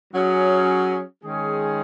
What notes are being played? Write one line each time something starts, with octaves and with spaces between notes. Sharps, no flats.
F#3 C#4 G#4
D#3 G#3 C#4 G#4